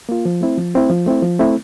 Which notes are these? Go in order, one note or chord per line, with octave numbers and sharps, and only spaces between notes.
A#3 F4
F3
A3 C4 E4
F3
A3 C4 E4
F3
A3 C4 E4
F3
A3 C4 E4